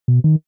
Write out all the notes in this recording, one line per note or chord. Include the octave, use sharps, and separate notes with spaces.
B2
D#3